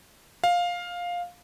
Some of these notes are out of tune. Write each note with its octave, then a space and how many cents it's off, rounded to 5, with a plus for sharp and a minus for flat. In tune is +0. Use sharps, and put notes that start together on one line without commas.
F5 +10